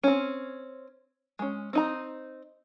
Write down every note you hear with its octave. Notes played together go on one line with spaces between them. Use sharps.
C4 C#4
G#3 C#4
C4 D#4 A#5